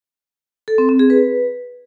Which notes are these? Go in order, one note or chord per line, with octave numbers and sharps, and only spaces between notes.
A4
C4
C4
G#4
B4